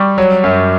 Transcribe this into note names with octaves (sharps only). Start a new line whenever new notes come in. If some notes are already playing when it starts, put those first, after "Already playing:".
Already playing: G3 C#6
F#3
F#2